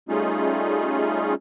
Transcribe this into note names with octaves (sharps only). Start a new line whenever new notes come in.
G3 A3 C#4 D#4 F4 G#4